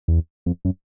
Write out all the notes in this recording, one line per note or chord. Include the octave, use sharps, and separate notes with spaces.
E2
F2
F#2